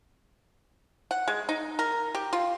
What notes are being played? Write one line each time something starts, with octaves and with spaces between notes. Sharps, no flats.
F#5
G#3
D#4
A#4
G4
F4